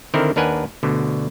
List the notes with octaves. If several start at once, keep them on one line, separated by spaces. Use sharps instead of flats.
D3 D#3 C4 E4 A#4
D#2 D4 A#4 B4 F#5 G#5
D2 B2 D3